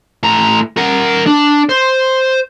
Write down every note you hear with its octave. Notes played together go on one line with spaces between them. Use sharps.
A2 A#5
A#4 F#5
D4
C5